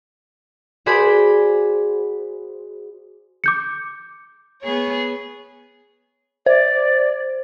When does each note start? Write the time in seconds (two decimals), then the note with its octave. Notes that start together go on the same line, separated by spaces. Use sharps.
0.86 F#4 G#4 C5 D5 B5 C6
3.44 D6 G6 C#7
4.62 B3 G#4 C#5
6.46 C5 D5